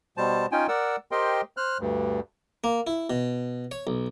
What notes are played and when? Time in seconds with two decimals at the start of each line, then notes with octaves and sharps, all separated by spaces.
0.17 B2 G3 C5 A5
0.52 C#4 D#4 F4 G5 G#5
0.68 A#4 D5 F#5 E6
1.11 G4 A#4 C5 D#5 G5 C6
1.57 C5 F6 F#6
1.80 D2 G2
2.64 A#3
2.87 E4
3.10 B2
3.71 C#5
3.87 B1